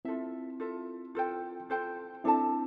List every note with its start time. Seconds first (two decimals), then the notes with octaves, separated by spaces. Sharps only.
0.05 C4 E4 F4 A4 E5
0.60 F4 A4 E5
1.15 F4 A4 C5 G5
1.70 F4 A4 C5 G5
2.24 C4 D4 E4 A4 E5 A5